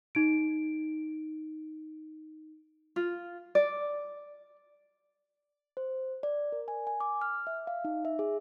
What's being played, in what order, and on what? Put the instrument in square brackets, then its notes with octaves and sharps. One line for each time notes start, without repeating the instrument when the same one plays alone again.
[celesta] D#4 D7
[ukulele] F4
D5
[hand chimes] C5
D5
A#4
G#5
G#5
D6
F6
E5
F5
D#4
E5
G#4